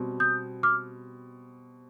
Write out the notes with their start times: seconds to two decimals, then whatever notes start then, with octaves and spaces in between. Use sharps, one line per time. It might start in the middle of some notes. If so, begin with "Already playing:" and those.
Already playing: B2 G3 C4
0.20 D#6 G6
0.63 D6 F6